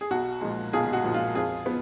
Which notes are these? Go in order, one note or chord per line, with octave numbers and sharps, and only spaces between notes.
G#4
B1 F#4
A#2 F3 G#3
B1 F4 G#4
F#4
A#2 F3 G#3
F4
F2 F4 G#4
F3 B3